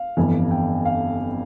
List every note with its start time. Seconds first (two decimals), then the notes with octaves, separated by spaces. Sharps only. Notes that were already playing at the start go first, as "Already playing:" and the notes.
Already playing: F5
0.17 G1 F2 E3
0.51 G5
0.85 F5